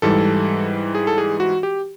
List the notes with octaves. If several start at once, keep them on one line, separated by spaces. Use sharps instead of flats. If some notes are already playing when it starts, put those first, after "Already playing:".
G#2 E3 G3 A4
G#4
A4
G#4
F#4
G4